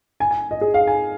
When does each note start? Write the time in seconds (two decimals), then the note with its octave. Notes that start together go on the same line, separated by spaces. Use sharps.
0.20 G#5
0.31 G#5
0.51 D#5
0.61 G#4
0.74 F5
0.87 G#5